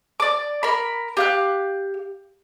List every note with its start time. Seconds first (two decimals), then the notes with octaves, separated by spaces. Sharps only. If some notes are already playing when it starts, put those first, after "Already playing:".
0.20 D5 D6
0.63 A#4 B5
1.17 G4 F5 F#6